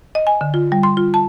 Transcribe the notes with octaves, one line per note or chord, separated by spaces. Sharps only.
D#5
G#5
D3
F4
G3
C6
F4
A5